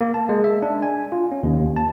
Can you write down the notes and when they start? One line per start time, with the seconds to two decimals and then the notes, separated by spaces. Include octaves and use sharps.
0.01 A#3
0.14 A5
0.29 G#3
0.44 E5
0.62 D4
0.82 G#5
1.12 F4
1.32 C#4
1.43 D#2
1.76 A5